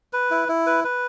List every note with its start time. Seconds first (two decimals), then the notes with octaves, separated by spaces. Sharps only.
0.13 B4
0.31 E4
0.49 E4
0.67 B4
0.84 B4